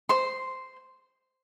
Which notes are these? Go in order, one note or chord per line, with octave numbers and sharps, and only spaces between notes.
C5 C6